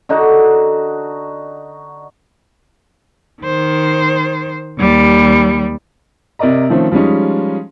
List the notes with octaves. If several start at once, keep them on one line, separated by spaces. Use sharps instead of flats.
D3 D#4 F#4
D#3 C5
D#2 G3
C3 A#4 D5 D#5 A#5
D#3 F3 A3 C4 C#4
F3 G3 G#3 C#4 D#4